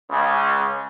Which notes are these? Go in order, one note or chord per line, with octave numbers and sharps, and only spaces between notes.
C#2 C#3